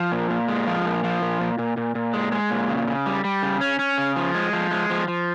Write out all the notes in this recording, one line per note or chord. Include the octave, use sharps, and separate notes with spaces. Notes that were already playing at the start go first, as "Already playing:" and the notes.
Already playing: F3
A#2
A#2
G#3
F3
A#2
F3
A#2
A#2
A#2
A#2
A#2
G#3
G#3
A#2
C#3
C#3
G3
G3
C#3
C#4
C#4
C#3
F3
G#3
F3
G#3
F3
F3